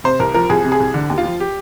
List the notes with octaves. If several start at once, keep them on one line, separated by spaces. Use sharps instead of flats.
C3 C5
C2 A#4
F3 A#4
C2 G#4
C3
G#4
C2
D3
D#2
F4
F3
G4